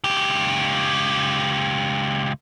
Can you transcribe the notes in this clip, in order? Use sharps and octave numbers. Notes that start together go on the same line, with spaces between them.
C#2 G4